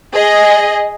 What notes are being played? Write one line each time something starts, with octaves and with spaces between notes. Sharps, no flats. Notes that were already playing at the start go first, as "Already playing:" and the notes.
G#4 D#5